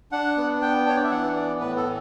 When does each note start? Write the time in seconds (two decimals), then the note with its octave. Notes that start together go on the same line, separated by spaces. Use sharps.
0.12 D4 F#5
0.37 B3
0.61 B3 G5
0.86 D4 C#5
0.96 D5
1.03 E5
1.11 E3 F#5
1.36 B3 D5
1.60 A2 B4
1.77 A4
1.84 E3